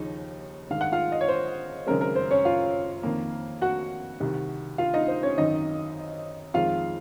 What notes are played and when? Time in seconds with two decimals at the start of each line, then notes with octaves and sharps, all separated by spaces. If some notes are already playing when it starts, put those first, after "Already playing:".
Already playing: D#2 C#3 F3 D#4
0.70 G#2 D#3 G#3 F5
0.81 F#5
0.92 F4 F5
1.12 D#5
1.21 C#5
1.28 C5
1.87 F#1 F#2 D#3 G#3 C4 A#4
2.01 A#4
2.16 C5
2.31 C#4 C#5
2.45 F4 F5
3.03 F2 D#3 A#3
3.62 F#4 F#5
4.20 C2 C3 D#3
4.78 F4 F5
4.94 D#4 D#5
5.08 C5
5.23 C#4 C#5
5.37 G#1 F#2 D#3 D#4 D#5
6.54 F2 D#3 G#3 F4 F5